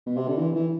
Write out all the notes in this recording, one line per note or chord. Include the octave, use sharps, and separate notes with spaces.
B2
C3
D3
E3
E3